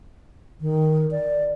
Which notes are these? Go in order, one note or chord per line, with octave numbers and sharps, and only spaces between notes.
D#3
D5